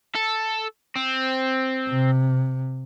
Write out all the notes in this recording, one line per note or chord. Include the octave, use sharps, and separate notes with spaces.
A4
C4
C3